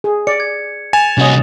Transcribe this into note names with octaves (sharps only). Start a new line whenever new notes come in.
G#4
D5 C#7
G#6
G#5 A6 E7 F7
C2 C#4 F#4 D#5